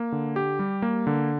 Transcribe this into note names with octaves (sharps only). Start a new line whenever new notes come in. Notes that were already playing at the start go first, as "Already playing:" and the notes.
Already playing: A#3
D3
G4
G3
A#3
D3